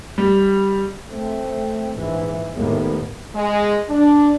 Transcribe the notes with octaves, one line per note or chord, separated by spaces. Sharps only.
G3
A3 C4
A#1 G#2 E3
D#2 A2 G#3 A#3 B3
G#3
D4